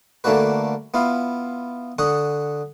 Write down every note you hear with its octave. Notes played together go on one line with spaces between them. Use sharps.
D3 A3 A#3 D4 F#4 B4
B3 E4 F4 F5
D3 F#5 C#6 D#6